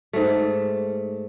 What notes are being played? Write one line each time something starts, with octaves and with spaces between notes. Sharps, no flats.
G#2 A3